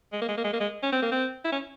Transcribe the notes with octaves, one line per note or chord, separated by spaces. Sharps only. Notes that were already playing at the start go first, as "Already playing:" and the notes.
G#3
A#3
G#3
A#3
G#3
A#3
G#3
C#4
C4
A#3
C4
E4
C#4